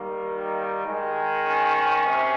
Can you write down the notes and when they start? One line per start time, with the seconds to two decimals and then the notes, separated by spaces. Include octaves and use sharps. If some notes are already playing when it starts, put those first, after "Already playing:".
Already playing: D#3 G3 A#3
0.23 D#4
0.84 D#3 G#3
1.44 C#4
2.06 C3